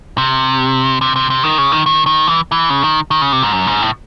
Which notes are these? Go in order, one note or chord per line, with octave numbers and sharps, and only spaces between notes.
C3
C3
C3
C3
D#3
C#3
D#3
D#3
D#3
E3
E3
C#3
D#3
D#3
C#3
C3
G#2
F#2
G#2
A2